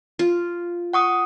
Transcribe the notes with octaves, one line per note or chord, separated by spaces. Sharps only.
F4
F#5 C#6 D#6